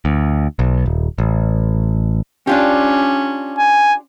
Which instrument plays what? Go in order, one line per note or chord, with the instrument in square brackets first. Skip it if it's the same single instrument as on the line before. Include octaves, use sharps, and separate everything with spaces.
[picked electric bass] D2
B1
D#1
A1
[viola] C#4 [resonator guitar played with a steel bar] D4 F4 G4
[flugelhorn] G#5